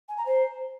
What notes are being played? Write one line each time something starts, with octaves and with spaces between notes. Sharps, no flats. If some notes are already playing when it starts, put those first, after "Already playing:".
G#5
A#5
C5